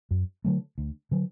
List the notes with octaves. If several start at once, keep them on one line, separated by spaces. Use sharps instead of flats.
F#2
D3 F#3 A3
D2
D3 F#3